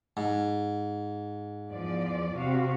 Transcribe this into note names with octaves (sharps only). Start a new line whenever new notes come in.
G#2
E2 F3 D5
C3 F#4 F5